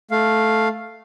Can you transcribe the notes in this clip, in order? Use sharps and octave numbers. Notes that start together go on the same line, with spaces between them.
A3 F5